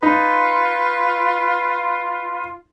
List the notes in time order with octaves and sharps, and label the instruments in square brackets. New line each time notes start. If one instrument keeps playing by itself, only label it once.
[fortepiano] D#4 [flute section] F4 [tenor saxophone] B4